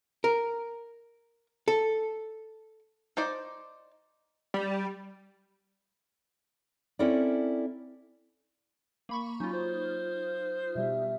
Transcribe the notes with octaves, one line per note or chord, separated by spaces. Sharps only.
A#4
A4
D#4 C5 D5
G3
C4 C#4 E4 A4 A#4 D5
A#3 B5 C#6
F#3 C#4 D#4 F4
C5
B2 G3 E5